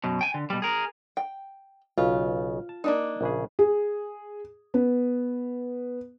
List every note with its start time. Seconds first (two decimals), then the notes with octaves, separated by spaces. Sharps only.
0.04 F#2 B2
0.21 G5 G#5
0.34 D3
0.50 B2 G3
0.62 G#4 A#4
1.17 G5
1.98 B1 C#3 F4
2.69 A5
2.84 A#3 D4 D#4
3.21 A#1 C#3 G#4
3.59 G#4
4.74 B3